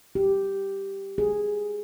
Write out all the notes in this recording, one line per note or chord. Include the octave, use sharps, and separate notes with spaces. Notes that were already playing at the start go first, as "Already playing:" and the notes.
G4
G#4